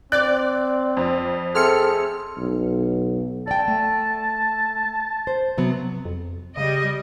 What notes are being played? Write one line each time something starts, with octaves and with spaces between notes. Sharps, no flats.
C4 D5 F#6
F2
A3 C4 G#4 A4 F6 C#7
B1
D5 G5 A5
A3
C5
C3 F#3 B3
F2
C#3 G3 D#5